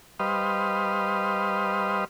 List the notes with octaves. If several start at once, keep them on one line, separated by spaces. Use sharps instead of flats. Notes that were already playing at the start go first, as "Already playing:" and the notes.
G3 B4 C5 D#5 F5